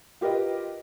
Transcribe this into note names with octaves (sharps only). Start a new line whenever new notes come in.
F4 G4 A#4 B4 D#5